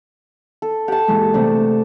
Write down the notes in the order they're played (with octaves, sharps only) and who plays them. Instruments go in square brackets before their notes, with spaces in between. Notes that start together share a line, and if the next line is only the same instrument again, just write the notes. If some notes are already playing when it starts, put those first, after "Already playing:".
[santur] A4
[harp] G4 [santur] F#5 A5
[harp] A#2 E3 G#3
C3 A3 D4